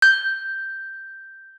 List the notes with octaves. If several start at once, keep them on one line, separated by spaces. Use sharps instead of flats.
G6